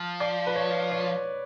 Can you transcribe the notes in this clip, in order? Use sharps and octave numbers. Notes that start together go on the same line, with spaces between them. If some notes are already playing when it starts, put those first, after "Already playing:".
Already playing: F3
D5
B4
C#5
C#5